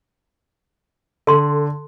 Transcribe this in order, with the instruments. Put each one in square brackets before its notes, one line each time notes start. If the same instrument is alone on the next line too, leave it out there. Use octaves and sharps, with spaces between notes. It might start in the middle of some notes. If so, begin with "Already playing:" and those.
[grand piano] D3 [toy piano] A4 C6